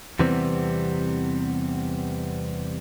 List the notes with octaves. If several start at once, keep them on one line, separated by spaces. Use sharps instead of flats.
E2 C3 E3 G3 B3 C4